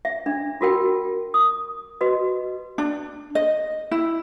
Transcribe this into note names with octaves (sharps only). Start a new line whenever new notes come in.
E5
D4
F4 F#4 A#4 G5
D#6
F#4 B4 D#5
D4
D#5
E4